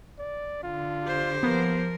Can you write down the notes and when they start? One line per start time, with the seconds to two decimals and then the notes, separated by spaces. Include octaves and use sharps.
0.19 D5
0.63 D3 F4
1.04 G4 C5
1.43 F3 A#3 B3 A#4